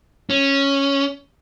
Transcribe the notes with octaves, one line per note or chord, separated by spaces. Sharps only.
C#4